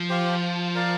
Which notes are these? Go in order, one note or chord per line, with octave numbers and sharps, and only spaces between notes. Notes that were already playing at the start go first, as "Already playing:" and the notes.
Already playing: F3
G4 C5 F5
F4
A#4 D5 F5